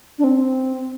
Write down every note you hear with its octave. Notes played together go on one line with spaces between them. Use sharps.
D4
C4